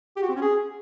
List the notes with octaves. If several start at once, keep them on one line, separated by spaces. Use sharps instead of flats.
G4
F#4
C4
C#4
G#4